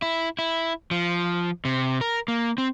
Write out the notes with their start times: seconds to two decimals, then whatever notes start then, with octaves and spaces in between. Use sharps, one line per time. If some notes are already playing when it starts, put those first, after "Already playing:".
0.02 E4
0.39 E4
0.91 F3
1.65 C3
2.01 A#4
2.28 A#3
2.58 C4